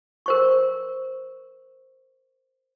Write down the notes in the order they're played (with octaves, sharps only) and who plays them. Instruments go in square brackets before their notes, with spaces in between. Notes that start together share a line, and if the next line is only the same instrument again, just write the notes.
[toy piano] A#4 C5 C#6